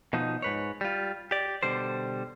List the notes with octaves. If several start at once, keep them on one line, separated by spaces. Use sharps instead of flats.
B2 F3 D#4
G#2 B4 C#5
G3 F4
G4 D5
B2 D3 G3 C5